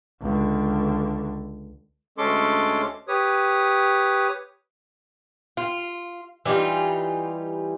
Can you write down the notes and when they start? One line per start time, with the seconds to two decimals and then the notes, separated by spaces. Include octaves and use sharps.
0.21 C#2 D3
2.18 D2 G#3 C#4 A4 C6 D6
3.08 G4 B4 C#5 D#6
5.57 F4
6.45 E3 G3 D#4 F4